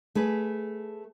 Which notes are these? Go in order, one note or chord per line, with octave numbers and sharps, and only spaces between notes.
A3 G#4 B4